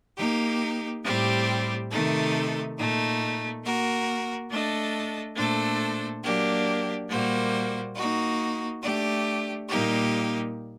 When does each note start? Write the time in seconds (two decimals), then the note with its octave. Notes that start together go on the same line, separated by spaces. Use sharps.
0.17 A#3 D#4 G4
1.03 A2 G3 C4 G4
1.90 C3 D#3 A3 D#4 A4
2.76 A#2 A3 D#4
3.63 A#3 F#4 A#4
4.49 A3 D4 A4 D#5
5.36 A#2 A3 D4 A4 C5
6.22 F#3 A#3 D4 G4
7.08 A#2 G3 A#3 F#4 C5
7.95 A#3 D#4 F#4
8.81 A3 D4 G4
9.69 A#2 G3 A#3 D#4 G4